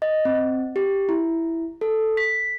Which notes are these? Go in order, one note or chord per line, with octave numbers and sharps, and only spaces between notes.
D#5
C4
G4
E4
A4
B6